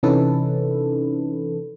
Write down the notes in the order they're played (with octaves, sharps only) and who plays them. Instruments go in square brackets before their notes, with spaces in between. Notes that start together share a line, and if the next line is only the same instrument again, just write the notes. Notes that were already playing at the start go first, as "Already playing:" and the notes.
[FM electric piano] C3 E3 C#4 D#4 A4 B4